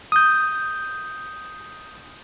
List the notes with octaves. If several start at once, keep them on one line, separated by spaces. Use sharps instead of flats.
D#6 G6